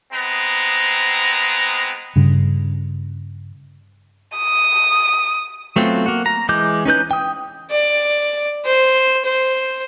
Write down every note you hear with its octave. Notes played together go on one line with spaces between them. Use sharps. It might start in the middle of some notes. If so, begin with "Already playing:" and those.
G#3 B3 C4 A#5
G2 C#3
D#6
F#3 A3 B3 C4 F4
A#3 F#4
A#5
E3 G#3 D6 G6
C#4 D#4 B4 G6
G5 D#6
D5
C5
C5